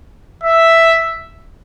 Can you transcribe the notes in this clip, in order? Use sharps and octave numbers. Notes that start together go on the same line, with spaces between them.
E5